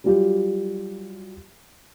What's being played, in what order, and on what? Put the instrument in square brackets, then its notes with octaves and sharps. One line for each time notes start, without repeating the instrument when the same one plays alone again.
[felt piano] F#3 G3 F4 G4